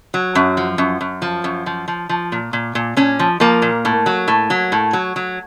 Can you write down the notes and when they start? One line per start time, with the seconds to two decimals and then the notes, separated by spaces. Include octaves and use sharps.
0.14 F#3
0.35 F#2
0.57 F3
0.78 F#2
1.01 F#2
1.22 F3
1.44 F#2
1.66 F3
1.88 F3
2.09 F3
2.32 A#2
2.53 A#2
2.75 A#2
2.97 A#2 C#4
3.19 F3
3.40 F3 A#3
3.62 A#2
3.85 A2
4.06 F#3
4.28 A2
4.50 F#3
4.72 A2
4.93 F#3
5.16 F#3